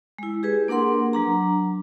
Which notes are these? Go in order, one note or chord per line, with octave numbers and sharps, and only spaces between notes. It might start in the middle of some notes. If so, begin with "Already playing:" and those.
G#3 E4
G4 G#4 B4
A#3 D4 A#4 F#5 C6
F#3 D4 A#5